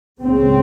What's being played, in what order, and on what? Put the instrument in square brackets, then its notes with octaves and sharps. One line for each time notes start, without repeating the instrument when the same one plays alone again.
[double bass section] C#2 C#3 C4